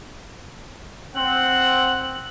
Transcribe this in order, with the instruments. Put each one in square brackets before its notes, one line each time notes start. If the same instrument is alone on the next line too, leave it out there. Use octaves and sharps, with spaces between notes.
[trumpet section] C4 F#5 [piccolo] F#7